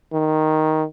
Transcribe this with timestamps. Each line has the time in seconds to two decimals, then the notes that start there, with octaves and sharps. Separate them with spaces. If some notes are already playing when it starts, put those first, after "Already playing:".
0.13 D#3